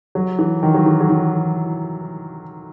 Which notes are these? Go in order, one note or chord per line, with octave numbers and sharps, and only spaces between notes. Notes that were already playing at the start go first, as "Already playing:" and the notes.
F#3
E3
D#3
F#3
E3
F#3
E3